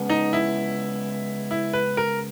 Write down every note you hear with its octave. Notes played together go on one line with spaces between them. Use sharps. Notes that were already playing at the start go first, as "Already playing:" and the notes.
Already playing: C#3 G#3 B3
D#4
E4
E4
B4
A#4